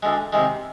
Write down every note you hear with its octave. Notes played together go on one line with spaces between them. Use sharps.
D2 D3 G#3
C3 D#3 G#3